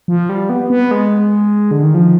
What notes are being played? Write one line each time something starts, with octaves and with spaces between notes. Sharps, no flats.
F3
G3
B3
B3
G#3
D3
D#3
F3